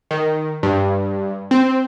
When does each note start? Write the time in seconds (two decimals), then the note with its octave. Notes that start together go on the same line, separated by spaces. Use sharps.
0.11 D#3
0.63 G2
1.51 C4